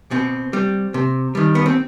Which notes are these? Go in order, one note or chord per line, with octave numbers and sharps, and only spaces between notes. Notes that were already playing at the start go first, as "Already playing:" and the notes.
B2 C4
G3
C3
D#3 G3
B3
C4